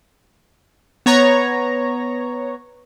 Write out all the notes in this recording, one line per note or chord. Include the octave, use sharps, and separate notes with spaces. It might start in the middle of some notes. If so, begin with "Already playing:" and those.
B3 C#5 A#5